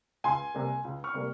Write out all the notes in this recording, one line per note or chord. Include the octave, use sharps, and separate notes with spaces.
C#2 G#5 C6
C3 G3 A#3
C#2
C#6 F6
C3 G3 A#3